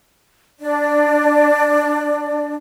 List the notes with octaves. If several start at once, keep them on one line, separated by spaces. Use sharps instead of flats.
D4 D5